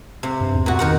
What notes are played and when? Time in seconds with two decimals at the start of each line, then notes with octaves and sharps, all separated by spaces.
0.23 C3
0.41 G2
0.54 E2
0.66 E2 A#2 F#4
0.79 D#3 A#4 F#5